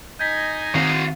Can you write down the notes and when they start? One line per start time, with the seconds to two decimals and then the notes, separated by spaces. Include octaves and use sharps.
0.19 D#4 D#5 G#5 G6 G#6 B6
0.75 D#3 C4 F#4 F5